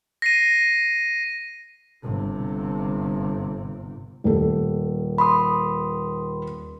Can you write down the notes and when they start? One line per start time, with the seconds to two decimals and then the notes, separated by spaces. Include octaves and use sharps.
0.22 A#6 C7 D#7
2.03 G1 C3
4.24 D#1 A4
5.18 B5 C6 D#6